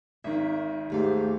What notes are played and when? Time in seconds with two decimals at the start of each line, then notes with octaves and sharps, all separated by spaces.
0.24 G#1 D#3 E5
0.90 D#2 G#2 A3 G4 F5